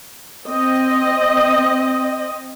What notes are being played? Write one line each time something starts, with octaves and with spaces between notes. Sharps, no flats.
C4 D#5